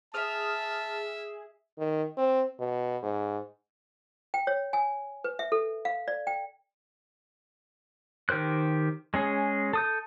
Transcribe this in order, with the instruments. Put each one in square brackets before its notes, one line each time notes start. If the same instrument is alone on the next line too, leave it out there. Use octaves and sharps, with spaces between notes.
[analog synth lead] G#4 [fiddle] E5 [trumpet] A5 [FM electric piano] D#6 F6
[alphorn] D#3
C4
B2
G#2
[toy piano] G5
C#5
G#5
B4
E5
A4
F5
D5
G5
[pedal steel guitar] D#3 G4 A#4 C5 F#6
G#3 C#4 G#4
A4 D#6 G6